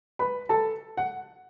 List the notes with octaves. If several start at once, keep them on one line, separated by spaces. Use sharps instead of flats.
B4 B5
A4 A5
F#5